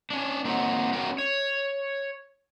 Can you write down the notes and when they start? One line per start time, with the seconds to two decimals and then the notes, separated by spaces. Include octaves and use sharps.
0.10 C#4 D4
0.45 A#3 C4 D#4 F#4 C#5
0.93 B3 C#4 F#4 A#4 F#5 G5
1.18 C#5